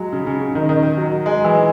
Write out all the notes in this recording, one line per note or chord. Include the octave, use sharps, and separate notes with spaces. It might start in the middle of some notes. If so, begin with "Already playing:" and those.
Already playing: F#3 G#3
C#3
C#3
C#3
D#3
D#3
D#3
F#3
G#3
E3